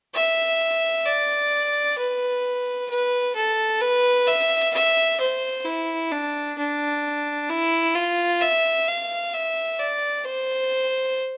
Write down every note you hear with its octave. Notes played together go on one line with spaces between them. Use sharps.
E5
D5
B4
B4
A4
B4
E5
E5
C5
E4
D4
D4
E4
F4
E5
F5
E5
D5
C5